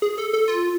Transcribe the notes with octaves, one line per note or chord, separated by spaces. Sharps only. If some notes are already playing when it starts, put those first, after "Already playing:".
G#4
A4
A4
F4